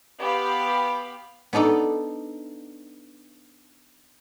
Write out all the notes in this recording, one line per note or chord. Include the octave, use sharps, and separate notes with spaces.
B3 G4 F5 B5
B3 D4 D#4 A4 D5